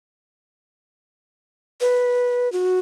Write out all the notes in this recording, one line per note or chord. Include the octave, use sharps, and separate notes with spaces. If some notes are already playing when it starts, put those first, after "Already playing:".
B4
F#4